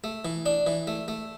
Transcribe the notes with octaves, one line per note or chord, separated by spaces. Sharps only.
A3
E3
D4
E3
A3
A3